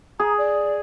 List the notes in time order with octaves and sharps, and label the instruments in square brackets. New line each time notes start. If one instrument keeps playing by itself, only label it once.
[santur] G#4 [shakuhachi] A#5
[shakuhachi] D5